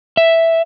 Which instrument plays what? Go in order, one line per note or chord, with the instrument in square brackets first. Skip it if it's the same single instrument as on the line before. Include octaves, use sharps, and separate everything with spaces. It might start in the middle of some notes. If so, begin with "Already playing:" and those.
[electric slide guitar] E5